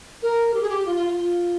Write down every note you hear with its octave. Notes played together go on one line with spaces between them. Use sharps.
A#4
G4
G#4
G4
F4
F4
F4
F4